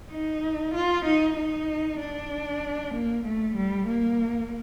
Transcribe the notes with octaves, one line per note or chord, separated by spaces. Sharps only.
D#4
F4
D#4
D#4
D4
A#3
A3
G3
A#3